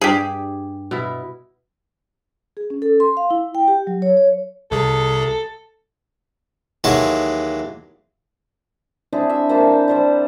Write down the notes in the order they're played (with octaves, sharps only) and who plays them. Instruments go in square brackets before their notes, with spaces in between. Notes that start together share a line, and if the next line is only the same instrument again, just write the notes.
[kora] G2 [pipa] G4 G#4
[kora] B2 E4
[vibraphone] G#4
C#4
A4
C6
F5
E4
G5
G4
F#3
C#5
C#5
[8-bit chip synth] C2 C3 G#4 [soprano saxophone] A4
[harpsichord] D#2 E3 F#3 G#3 A5 C#6
[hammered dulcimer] C4 D4 E4 G#4
E5
A#3 E4 C5 A5
G3 A5
G3 C5 D5